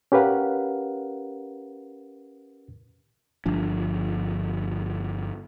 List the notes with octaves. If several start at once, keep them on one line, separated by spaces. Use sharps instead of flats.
C#4 G4 A#4 B4 F5 F#5
G1 F3 D4